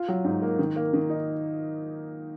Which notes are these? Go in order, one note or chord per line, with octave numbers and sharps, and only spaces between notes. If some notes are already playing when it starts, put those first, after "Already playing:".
Already playing: F4
F#3
G#2
A#3
D#3
A#3
D#3
D#4